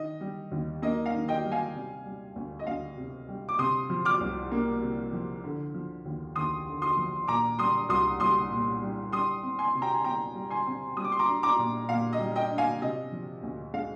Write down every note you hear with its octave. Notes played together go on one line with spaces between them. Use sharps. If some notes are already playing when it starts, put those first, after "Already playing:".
Already playing: D#3 D#5
G3
D#2
A#3 D#5
F5
D#3
D#5 G5
G3
F5 G#5
C3
G3
D2
D#5
D2 F5
C3
G3
D6
C3 C6 D#6
F3
D6 F6
C2
A#3
C3
F3
D3
F3
D#2
D#2 C6 D#6
D3
C6 D#6
F3
A#2 A#5 D6
G3 C6 D#6
C2 C6 D#6
C2 C6 D#6
A#2
G3
G3 C6 D#6
C4
G#5 C6
C3
G5 A#5
G#5
C3 G5 A#5
G3
G#5 C6
C4
G3 D#6
D6
C6
A#5 D6
D4
A#5 D6
A#2
A#2 F5
D#5
G3
D#5 G5
D4
F5 G#5
C3 D#5
F3
D2
G#3 F5